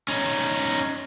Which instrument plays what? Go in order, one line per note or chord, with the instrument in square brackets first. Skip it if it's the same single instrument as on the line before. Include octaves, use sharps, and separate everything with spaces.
[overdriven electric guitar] C#4 D#4